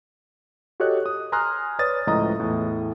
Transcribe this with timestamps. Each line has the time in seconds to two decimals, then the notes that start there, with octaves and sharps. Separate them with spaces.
0.80 F#4 G4 A4 C#5 D#5 F#6
1.06 D#6
1.32 G#5 A#5 C6 D#6 F6 F#6
1.79 B4 C#5 D5 D#6 A6
2.07 C#2 A2 F3 D#5 A#5 D#6
2.40 E2 A2